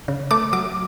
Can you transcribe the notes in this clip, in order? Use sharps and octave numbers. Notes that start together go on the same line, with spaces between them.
C#3
A3 D6
F#3 D6